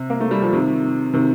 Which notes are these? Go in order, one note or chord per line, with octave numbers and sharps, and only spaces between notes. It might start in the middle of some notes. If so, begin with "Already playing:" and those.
Already playing: C3
A#3
A3
G3
F3
C3 D#3
C3 D#3